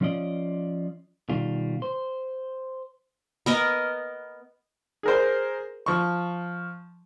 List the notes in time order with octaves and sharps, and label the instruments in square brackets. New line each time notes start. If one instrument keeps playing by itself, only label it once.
[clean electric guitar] F3 C#4 F4 D5 D#5
B2 D#3 G3 F4
C5
[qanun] B3 A#4 D#5
[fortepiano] G#4 A#4 C5
F3 C#6